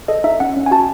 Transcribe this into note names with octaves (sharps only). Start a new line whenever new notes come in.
A4 D#5
D#4 E5
C#4 F#5
C#4
G#5
F#4 A5